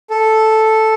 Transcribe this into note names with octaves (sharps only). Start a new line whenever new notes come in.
A4